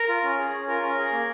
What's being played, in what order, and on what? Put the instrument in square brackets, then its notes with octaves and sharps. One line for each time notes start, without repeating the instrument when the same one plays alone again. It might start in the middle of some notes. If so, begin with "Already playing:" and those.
Already playing: [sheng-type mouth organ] A#4
F4
C#4
G#4
C#4
F4 A#4
C#4
G#4
A#3